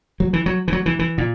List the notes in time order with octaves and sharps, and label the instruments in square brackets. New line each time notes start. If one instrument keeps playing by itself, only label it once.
[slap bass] F#3
E3
F#3
E3
F#3
E3
E3
A#2